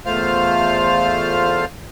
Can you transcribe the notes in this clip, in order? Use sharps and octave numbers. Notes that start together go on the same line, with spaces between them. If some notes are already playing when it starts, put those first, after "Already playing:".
E2 A3 F4 C5 F5 F6